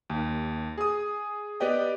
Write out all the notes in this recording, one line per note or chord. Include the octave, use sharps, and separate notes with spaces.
D#2
G#4 D#6
B3 G4 B4 D5 D#5 G5